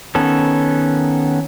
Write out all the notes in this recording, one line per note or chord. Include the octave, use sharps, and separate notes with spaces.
D#3 B3 C#4 A4